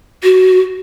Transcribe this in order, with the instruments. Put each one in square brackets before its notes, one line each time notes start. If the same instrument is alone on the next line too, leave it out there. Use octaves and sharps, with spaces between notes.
[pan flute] F#4